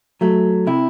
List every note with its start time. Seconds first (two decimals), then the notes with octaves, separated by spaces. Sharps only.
0.21 F#3 A3
0.67 C3 E4